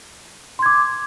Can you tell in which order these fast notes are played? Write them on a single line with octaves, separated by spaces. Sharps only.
C6 G#6 D6